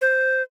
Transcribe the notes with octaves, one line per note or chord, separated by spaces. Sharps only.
C5